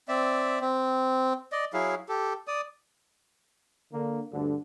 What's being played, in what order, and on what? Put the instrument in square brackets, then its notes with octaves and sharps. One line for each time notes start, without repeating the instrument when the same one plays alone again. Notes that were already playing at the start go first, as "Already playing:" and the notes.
[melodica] C4 D5 E5
C4
D5 D#5
F#3 E4 G#4 F5
G4 A4
D5 D#6
[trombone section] D3 A#3
D2 G2 D3